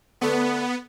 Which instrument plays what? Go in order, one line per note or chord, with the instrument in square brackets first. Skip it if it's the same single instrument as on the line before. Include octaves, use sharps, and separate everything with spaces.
[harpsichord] D3 A3 E4 [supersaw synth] B3